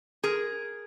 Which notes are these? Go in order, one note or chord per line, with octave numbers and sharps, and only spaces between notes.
G#4 A#4